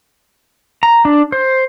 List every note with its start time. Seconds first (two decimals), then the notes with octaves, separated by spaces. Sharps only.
0.83 A#5
1.05 D4
1.32 C5